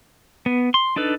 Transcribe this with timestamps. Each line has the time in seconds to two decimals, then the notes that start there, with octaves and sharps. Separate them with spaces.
0.46 B3
0.74 C6
0.96 D4 D#4 A4 B4